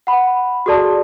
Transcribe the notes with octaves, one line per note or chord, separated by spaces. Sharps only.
F#5 B5
F#4 G#4 A4 D5 A5